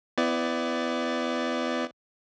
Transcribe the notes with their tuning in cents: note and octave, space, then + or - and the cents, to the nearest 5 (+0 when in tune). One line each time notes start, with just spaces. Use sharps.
B3 +30 E4 +20 D5 +0